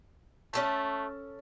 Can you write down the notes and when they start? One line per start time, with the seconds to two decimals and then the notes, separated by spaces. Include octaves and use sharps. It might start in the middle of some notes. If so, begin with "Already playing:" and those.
0.53 A3 C#4 A4 A5